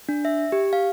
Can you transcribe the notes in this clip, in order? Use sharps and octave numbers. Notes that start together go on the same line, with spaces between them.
D4
E5
G4
F5